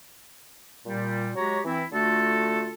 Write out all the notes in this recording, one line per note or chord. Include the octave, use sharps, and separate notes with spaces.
A#2 G3
F#3 G#3 F#4 G4 C#5 A#5
E3 C4 E4
D3 A3 F4 F#4 A4